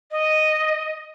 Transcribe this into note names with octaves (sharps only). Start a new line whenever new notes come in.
D#5